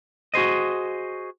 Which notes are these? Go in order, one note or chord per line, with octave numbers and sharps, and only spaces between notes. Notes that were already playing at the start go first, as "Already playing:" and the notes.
F#4 G#4 C5 D#5